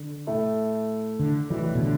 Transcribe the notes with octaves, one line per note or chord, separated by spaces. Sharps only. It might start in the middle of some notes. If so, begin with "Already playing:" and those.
Already playing: D3
A2 A3 E4
D3
B1 A2 E3 G3 E4
B2
D3